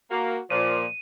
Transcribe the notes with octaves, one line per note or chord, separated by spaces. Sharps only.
A#3 F#4
A#2 F3 D5 D#7